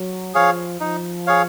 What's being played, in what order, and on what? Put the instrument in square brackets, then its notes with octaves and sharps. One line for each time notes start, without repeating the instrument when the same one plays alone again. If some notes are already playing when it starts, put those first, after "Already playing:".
Already playing: [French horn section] F#3
[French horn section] F3 [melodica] G#4 C#5 F5
[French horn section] F3 [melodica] D#4
[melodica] G#4 C#5 F5